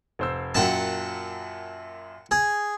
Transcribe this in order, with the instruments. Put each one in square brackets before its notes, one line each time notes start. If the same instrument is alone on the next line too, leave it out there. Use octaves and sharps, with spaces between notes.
[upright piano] F1 C5 E6
[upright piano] F#2 A#2 F#3 [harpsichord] F#5 G5 A5
[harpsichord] G#4